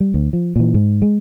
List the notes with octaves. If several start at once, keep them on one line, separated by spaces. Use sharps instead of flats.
G3
D2
F3
A#2 E3
G#2
G#3